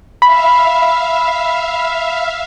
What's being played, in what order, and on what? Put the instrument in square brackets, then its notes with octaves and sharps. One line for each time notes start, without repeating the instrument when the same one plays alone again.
[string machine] E5 F5 [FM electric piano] B5